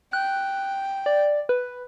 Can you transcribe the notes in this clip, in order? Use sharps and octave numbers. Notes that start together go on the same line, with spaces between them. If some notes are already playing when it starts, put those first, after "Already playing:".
G5 F#6
D5
B4